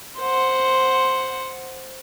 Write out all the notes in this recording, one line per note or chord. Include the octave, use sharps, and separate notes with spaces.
C5 F#5